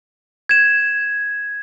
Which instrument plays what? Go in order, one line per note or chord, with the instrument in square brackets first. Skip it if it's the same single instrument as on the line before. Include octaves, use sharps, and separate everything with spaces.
[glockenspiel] G#6 E7